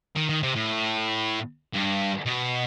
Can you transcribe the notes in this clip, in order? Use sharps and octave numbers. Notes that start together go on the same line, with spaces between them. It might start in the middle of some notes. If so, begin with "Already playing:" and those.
D#3
D#3
C3
A2
G2
B2